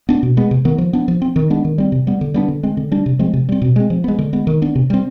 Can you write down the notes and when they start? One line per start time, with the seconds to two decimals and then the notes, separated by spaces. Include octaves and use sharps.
0.09 B3 D4
0.23 B2
0.37 G#3 B3
0.51 C3
0.65 D#3 B3
0.78 F3
0.93 B3 D4
1.08 F3
1.22 C4
1.36 D#3
1.50 G#3 B3 D4
1.64 D#3
1.78 G3 C4
1.92 C3
2.07 G3 B3
2.21 D3
2.34 G3 B3 D4
2.48 D3
2.63 G#3 C4
2.77 D3
2.92 G3 D4
3.06 C3
3.19 F3 G#3 C4
3.33 C3
3.49 G3 C4
3.62 B2
3.76 G#3 C4
3.90 F3
4.04 G#3 B3
4.18 D3
4.33 G#3 B3
4.47 D#3
4.62 B3 D4
4.75 C3
4.90 G3 C4